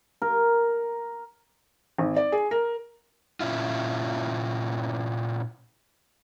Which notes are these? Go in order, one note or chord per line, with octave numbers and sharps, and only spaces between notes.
A#4
G#1
D5
G#4
A#4
A#2 C#4 E4 F4